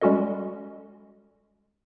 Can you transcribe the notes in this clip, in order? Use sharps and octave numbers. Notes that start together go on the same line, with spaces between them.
G3 G#3 C#4 F#4 A4 D#5